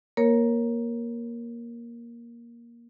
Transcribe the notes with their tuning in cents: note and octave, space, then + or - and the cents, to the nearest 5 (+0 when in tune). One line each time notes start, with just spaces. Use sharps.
A#3 +15 A#4 +0 C#5 -10